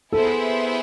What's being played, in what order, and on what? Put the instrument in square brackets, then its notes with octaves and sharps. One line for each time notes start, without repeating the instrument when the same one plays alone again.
[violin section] B3 E4 G#4 C5 E5 [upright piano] A4